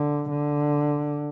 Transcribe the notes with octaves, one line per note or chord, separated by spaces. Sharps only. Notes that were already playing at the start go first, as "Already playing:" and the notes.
Already playing: D3
D3